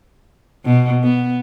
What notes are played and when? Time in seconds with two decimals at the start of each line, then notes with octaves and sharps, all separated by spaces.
0.66 B2
1.04 B3